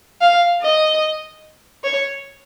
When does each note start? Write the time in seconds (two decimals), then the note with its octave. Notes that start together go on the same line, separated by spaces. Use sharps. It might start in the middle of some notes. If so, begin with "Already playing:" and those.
0.21 F5
0.62 D#5
1.84 C#5